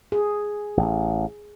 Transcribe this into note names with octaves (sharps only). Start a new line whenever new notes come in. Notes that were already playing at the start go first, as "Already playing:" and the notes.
G#4
A1